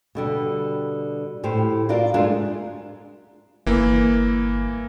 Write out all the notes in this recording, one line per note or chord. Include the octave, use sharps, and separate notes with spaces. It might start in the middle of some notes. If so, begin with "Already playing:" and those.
B2 D3 G3
A2 G4 C5
F4 F#4 A#4 D5 F5
G#3 A3 D4 F4 G4 G#4
G1 E3 A#3